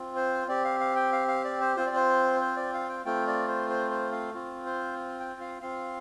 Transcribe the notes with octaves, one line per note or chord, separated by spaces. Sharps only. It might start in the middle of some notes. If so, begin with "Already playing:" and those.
Already playing: C4 F4
C5
C4 G4 D5
F5
F5
G5
F5
F5
D5
C5
C4 F4 C5
D5
C5
C5
D5
F5
G5
A3 C4 F4 G5
D5
C5
C5
C5
F5
C4 F4
C5
G5
F5
C4 F4 F5